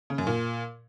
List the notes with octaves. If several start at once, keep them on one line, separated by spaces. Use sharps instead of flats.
C#3
F#2
A#2